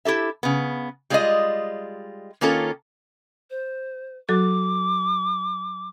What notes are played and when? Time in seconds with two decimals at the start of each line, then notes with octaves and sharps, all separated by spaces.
0.05 E4 G4 A4 E5
0.43 C#3 B3
1.10 G3 G#3 F4 F#4 D5 D#5
2.41 D#3 A#3 C#4 F4 A4
3.50 C5
4.29 F#3 F#4 A4 D6